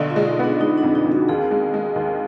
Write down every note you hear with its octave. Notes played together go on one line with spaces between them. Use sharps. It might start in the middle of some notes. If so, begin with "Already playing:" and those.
Already playing: B1 D3
F4
G#3
D#4
B3 D4
G#3 D#4
D4
F2
D#4
F2
F#4
D#2 G#4
G#3
G#3
D#2